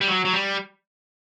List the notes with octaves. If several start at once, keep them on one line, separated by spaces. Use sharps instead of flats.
G3
F#3
F#3
G3